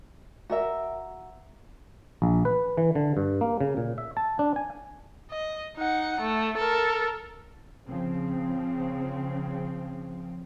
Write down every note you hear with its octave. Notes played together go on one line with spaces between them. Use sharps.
F#4 A#4 E5
A#1
B4
E3
D3
G2
A#3
C#3
A#2
E5
A5
D4
G#5
D#5
D#4 F#5
A3
A4 A#4
C#3 F3 C4